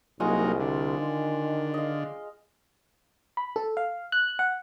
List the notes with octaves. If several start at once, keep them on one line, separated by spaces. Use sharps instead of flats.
C2 F#3 G#3 A#3 D#4 F4
D3
D#3
D#5 F5
B5
A4
F5
F#6
F#5